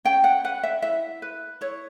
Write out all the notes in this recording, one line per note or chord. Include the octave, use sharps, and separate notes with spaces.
C#4 G5
F#5
B4 F#5
E5
E4 E5
B4
E4 C#5